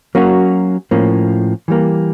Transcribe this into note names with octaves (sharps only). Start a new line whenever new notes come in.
F#3 A#3 C#4 F#4
A2 F3 A#3 C#4
E3 G3 A#3